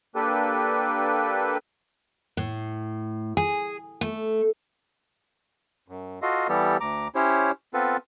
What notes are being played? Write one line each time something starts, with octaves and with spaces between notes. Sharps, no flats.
A#3 D4 G4 A4 B4
A2
G#4
A3
F#2
F4 F#4 A4 D#5 F5
E3 G3 B3 G4 A4
D2 A#5 D6
C#4 E4 G4 C5 C#5
B3 C4 F4 A4 B4